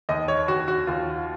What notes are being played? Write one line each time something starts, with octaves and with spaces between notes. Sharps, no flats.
D#2 D#5
C#5
D#2 F#4
F#4
D#2 F4